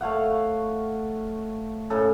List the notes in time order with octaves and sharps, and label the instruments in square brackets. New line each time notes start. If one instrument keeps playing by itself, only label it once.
[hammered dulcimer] A3 C#5 F5 F#5
A2 C#3 A4